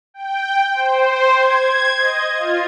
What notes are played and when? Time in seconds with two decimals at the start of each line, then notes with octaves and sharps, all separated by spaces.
0.14 G5
0.74 C5
1.35 G#6
1.97 D#5
2.36 F4